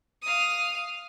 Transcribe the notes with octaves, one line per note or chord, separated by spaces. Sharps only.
F5 D#6